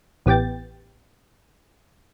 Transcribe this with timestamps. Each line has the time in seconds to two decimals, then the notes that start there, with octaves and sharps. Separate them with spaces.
0.26 A1 B3 G4 G5 A6